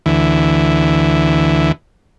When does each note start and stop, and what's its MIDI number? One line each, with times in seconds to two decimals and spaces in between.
0.06 1.72 38
0.06 1.72 52